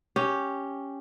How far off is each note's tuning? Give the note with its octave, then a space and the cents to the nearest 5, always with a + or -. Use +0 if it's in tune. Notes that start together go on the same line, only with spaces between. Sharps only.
C#4 +0 G4 +0